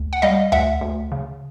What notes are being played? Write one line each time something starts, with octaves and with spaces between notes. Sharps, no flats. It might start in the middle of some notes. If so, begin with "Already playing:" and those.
Already playing: D2
F#5
G3 D#5 F5
D2 E5 F#5
D2
C#3